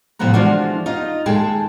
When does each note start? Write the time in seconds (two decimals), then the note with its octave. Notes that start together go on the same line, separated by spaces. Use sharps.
0.19 A2 C3 F3 B3 F#5 A#5
0.34 E3 F3 G#3 D4 F4 F#4
0.86 D#4 F4 D#5
1.26 D#2 G#3 G#4 A4 G5 A5